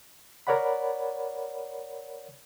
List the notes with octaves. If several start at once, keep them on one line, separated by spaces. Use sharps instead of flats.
A#4 C#5 D5 F#5 B5